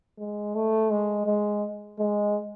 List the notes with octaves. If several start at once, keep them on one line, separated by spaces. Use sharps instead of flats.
G#3
A3
G#3
G#3
G#3